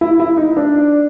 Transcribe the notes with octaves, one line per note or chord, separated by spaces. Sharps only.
E4
E4
D#4
D4